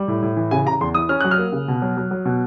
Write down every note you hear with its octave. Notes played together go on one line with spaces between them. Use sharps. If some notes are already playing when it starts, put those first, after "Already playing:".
Already playing: G3
A2
A2
E3
C#3 G#5
C#3 A#5
E2 C6
E3 D#6
C#4 F6
F#3 F#6
F6
A#3
C#3
B2
F#3
F#3
F#3
B2